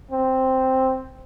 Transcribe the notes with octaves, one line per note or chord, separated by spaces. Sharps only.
C4